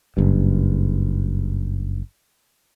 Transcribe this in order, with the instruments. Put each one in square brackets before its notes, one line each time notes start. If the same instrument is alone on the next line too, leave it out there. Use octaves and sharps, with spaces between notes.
[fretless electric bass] F#1 G2